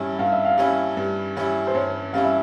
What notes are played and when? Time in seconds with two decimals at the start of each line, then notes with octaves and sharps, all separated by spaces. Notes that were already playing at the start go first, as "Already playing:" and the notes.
Already playing: G2 G3 C#4 E4
0.19 G2 F5
0.32 E5
0.45 F5
0.58 G3 C#4 E4
0.97 G2
1.37 G3 C#4 E4
1.67 C5
1.74 G2 C#5
2.13 G3 C#4 E4 F5
2.24 E5